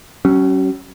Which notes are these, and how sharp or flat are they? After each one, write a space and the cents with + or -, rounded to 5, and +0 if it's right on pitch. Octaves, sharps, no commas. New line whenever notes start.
F#3 +40 C#4 +0